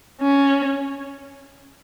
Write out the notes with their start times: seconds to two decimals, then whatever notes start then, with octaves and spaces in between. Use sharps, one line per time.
0.22 C#4